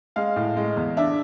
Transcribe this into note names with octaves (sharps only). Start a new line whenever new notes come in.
G#3 F5
A2
G#3
E2
D4 E5